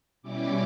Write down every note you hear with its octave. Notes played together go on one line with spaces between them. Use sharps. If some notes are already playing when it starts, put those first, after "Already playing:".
B2 G3 C#4 E4 D6